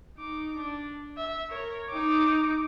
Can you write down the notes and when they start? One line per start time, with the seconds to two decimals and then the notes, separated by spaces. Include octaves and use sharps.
0.17 D#4 D6
0.56 D4
1.17 E5
1.49 A#4 C#5
1.89 D#4 D6